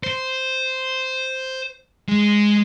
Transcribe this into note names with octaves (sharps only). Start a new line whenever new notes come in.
C5
G#3